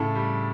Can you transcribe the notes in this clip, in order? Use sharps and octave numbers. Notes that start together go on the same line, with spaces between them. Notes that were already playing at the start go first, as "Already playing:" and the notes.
Already playing: A2 C#3 A4
G3